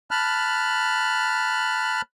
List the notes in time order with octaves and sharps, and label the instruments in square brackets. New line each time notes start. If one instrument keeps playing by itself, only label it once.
[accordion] A5 B5 F6 F#6